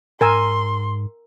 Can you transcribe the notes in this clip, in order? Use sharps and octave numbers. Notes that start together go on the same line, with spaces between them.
G#2 A#4 G#5 C6 E6